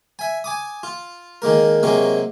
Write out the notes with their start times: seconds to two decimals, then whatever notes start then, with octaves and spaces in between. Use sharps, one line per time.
0.19 E5 G#5
0.44 G#5 D6 D#6
0.83 F4
1.42 D#3 G#3 A#3 A#4
1.83 C3 F#3 G#3 A#3 C4 C#4